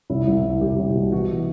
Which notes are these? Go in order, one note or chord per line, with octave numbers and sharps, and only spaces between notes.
C2 E4
C2
C2
C2 G4
C2
B2
E3 F#4